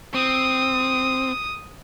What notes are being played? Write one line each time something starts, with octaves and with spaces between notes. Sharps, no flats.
C4 D#6